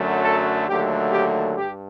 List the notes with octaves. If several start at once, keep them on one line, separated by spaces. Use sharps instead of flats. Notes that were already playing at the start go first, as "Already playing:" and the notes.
Already playing: F#2 D3 F#3 A3
A4
D#2 D3 F#3 A3 G4
G4
G2 G4